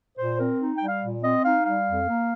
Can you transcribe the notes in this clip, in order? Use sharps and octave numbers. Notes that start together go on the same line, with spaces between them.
A#2 C5
C4 A#4
D#4
G3 G5
F5
A#2
C4 D#5
D#4 F5
G3 F5
F2
A#3